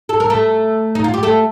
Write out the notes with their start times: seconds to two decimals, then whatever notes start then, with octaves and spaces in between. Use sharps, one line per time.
0.09 A4
0.20 A#4
0.30 A3 A4
0.95 D#4
1.04 F4
1.14 G4
1.23 A3 A4